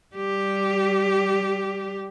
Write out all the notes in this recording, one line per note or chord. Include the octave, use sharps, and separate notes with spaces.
G3 G4